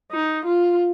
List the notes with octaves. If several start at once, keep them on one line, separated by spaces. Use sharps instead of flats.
D#4
F4